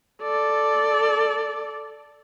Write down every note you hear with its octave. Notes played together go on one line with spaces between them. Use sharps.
A4 D5